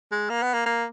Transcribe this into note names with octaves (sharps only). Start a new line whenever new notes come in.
G#3
A#3
B3
A#3
A#3